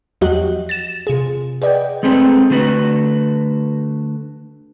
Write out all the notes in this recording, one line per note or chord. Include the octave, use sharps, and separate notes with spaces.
E2 F3 F#3 F#4 G4 D#5
A6 A#6 E7
C3 F4 G#4
G#4 B4 D5 D#5 F#5 G5
G#3 A3 C4 G#4 B4
D3 A3 F#4 B4